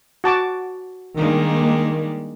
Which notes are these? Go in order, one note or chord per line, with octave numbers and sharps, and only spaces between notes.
F#4 A5 D6
D#3 G3 G#3 A#3 D4